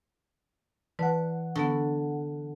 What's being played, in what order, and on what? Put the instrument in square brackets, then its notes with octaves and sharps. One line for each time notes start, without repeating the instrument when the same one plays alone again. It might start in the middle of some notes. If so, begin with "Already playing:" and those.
[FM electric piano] E3 F#5 [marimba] B4 D5 A5
[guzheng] D3 [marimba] B3 C#6